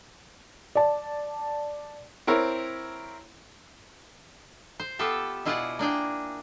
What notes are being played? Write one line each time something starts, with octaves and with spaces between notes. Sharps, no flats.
D5 A5
C4 E4 A#4 C#5
C5
B3 F4 G4 A4 E5
B2 E4 F4 G#4 D5 F#5
A#3 D4 G#4 G5